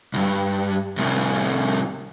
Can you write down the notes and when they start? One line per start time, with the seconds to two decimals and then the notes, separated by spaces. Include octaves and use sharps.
0.14 C2 G2
0.98 C2 A2